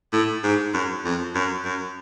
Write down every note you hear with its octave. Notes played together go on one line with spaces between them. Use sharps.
A2
G#2
F#2
F2
F#2
F#2